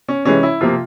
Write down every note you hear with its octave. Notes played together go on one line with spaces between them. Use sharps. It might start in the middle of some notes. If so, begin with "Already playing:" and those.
C#4
C3 E3 G#3 C#4
E4
C3 F3 A#3 F4